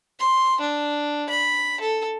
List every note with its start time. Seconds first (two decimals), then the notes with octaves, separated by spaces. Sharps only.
0.20 C6
0.60 D4
1.29 B5
1.80 A4